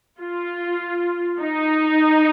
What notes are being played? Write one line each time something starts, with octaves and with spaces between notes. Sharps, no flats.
F4
D#4